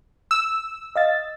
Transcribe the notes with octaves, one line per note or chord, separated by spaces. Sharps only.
E6
D#5 F5 A6